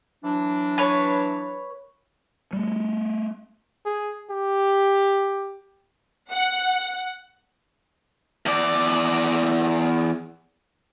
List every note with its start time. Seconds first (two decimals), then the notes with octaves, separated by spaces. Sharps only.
0.24 E3 F#3 D4
0.78 B4 C#5
2.53 G3 A3
3.86 G#4
4.30 G4
6.30 F#5
8.46 E2 D5